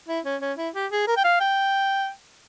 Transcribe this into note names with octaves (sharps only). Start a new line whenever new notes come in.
E4
C#4
C#4
E4
G4
G#4
A#4
G5
F5
G5